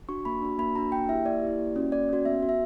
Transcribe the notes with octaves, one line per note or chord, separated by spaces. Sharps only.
D4 F#4 C#6
A#3 B5
D4 F#4
A#3 B5
D4 F#4 A#5
A#3 G5
E4 G4 E5
A#3 D5
E4 G4
A#3
C#4 F#4
A#3 D5
C#4 F#4
B3 E5
F#4
E5